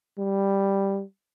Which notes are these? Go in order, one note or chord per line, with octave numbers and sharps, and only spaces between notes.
G3